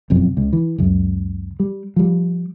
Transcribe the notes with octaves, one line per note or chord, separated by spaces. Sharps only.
F#1 B1 F2
C#2
E3
C#2 F#2
G3
F3 G3